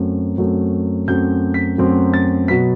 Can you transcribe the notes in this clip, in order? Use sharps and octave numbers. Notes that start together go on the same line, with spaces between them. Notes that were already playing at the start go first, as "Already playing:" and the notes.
Already playing: F#2 F#3 A3 C4
F#2 F#3 A3 C4
F#2 F#3 A3 C4 G6
B6
F#2 F#3 A3 C4
A6
B2 F#3 B3 B6